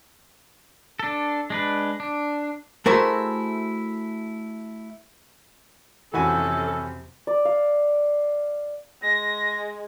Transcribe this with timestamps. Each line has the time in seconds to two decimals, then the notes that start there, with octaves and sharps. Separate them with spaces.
0.99 D4 A4
1.50 G#3 D4 B4
2.00 D4
2.86 A3 E4 F#4 G#4 A#4 C5
6.14 F2 C3 E3 C#4 F#4 A4 G#5
7.27 D5
7.45 F5
9.02 G#3 A#6